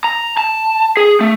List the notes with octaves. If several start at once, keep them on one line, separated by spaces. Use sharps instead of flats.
A#5
A5
G#4
A3